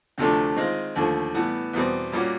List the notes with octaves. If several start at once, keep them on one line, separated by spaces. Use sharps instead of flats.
D2 C3 F3 A3 D4
D#3 G#3 C4 F4
D#2 D3 F3 A3
A2 E3 G3 B3
E2 B2 G3 C4
A#2 G3 A#3 C#4 F#4